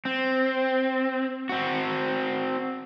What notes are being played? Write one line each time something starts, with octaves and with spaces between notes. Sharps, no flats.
C4
C4 F#4